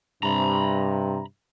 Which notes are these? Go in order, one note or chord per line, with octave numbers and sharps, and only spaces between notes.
G2 C3 A#5 B5